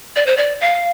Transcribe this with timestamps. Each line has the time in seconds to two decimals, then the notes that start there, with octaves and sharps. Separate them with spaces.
0.16 D5
0.27 C5
0.37 D5
0.61 F5